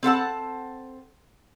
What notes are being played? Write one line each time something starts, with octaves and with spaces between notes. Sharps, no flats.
C4 A4 F#5 A5